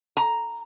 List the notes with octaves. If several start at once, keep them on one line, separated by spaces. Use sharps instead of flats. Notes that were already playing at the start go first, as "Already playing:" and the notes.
A#5